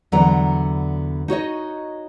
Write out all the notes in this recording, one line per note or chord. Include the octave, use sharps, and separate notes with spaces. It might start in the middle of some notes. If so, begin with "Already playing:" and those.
E2 D3 F#3 B3 A#5
D#4 F#4 C#5 D#5